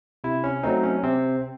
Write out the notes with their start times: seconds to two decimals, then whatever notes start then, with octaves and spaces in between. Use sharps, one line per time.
0.24 C3 E4
0.44 C#4
0.63 F#3 A3 C4 D#4
0.83 C#4
1.03 C3 C4